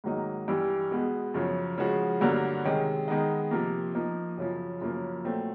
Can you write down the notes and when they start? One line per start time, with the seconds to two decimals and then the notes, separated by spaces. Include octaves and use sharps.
0.04 G#2 D#3 F#3 A#3 D#4
0.48 G2 E3 G3
0.91 B2 G#3 B3
1.34 F#2 C#3 F3
1.78 C#3 F3 G#3 C#4 F#4
2.21 G2 D3 F#3 A#3
2.65 C3 D#3 G#3 C#4
3.08 D#3 G#3 B3 D#4
3.51 C3 F3 A#3
3.95 F3 A#3 D#4
4.38 F#2 C#3 F3
4.81 F#2 C#3 F3 A#3
5.25 A#2 F#3 A3 C4